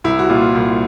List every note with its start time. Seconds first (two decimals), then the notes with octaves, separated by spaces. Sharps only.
0.04 C2 E4
0.19 F#4
0.29 A#2 F4
0.55 C2